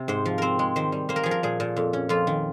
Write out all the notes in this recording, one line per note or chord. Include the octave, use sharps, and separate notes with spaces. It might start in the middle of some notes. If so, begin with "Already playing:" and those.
Already playing: C3
G#2 C5
F3
C4 A#4 C5
G#3
D#3 C5
G3
A#3 C5
A#4
F3 G#4
A#4
A#2 G#4
A#2
F2
C#4
F2 F4
D#3